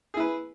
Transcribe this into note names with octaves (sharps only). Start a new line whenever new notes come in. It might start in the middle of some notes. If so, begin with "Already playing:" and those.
E4 G#4 B4